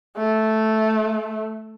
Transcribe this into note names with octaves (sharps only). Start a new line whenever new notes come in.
A3